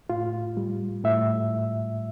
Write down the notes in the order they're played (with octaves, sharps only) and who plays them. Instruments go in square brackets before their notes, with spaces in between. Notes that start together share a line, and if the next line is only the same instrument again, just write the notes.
[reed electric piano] A2 F4
G3
A2 E5